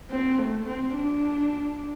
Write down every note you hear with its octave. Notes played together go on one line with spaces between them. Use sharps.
C4
A3
C4
D4